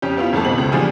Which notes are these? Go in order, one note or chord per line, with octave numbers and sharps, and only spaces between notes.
F2 C#4 G4
B3 E4 F4
G#1 F2 A3 A5
B2 C4 F#7
C#2
A#2 E3 F3 G3 D4 G#4